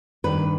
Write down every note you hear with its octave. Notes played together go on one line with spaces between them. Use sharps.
G2 D#3 B4